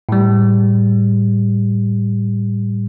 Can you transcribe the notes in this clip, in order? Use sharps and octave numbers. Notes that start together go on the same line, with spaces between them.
A2 G3